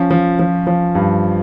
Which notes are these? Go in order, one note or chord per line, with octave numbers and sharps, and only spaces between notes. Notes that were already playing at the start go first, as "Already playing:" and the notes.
Already playing: F3 C#4
F3
F3
F3
G2